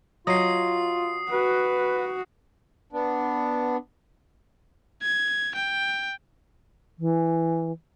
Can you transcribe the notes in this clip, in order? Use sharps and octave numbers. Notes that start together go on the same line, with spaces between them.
F#3 F4 D#5 D#6 C7
F#4 B4
B3 D4
G#6
G5
E3